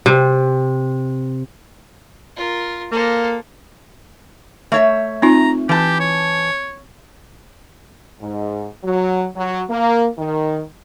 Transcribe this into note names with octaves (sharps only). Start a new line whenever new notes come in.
C3
F4 A#4
A#3 A4 C5
A3 C#5 E5
C4 D#4 F4 A#5
E3 G4 A5
C#5
G#2
F#3
F#3
A#3
D#3